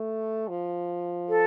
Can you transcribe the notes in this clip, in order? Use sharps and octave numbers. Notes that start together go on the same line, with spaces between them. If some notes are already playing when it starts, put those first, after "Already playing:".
Already playing: A3
F3
A4